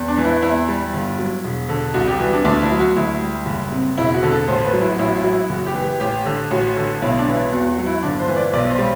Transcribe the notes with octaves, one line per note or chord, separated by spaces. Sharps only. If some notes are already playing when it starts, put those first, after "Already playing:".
Already playing: E2
D4
E3
E4
E2 E4
G3
G1
F#3
E1
D3
C2 F#4
G4
E3 F#4
D4
D2 D4
E4
F#3
F#4
D2 E4
G3
F#1
C3
E1 E4
F#4
D3
A4
A1 C5
B4
F#3
E4
F#4
A1 E4
F#4
E4
F#3 F#4
E4
F#1 F#4
G4
E3
G4
A1 G4
D3
A1 F#4
D3
B1 E4
D4
E3
E4
E2 F#4
F#4
F#3
E4
G1 D4
C5
E3
D5
B1 D5
C5
G3